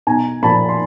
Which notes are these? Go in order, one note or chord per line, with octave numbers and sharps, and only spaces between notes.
B1 G#5 A#5
A#2 F3 A5 B5
C6